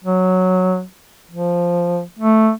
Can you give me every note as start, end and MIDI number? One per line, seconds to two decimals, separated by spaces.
0.04 0.83 54
1.31 2.02 53
2.19 2.51 57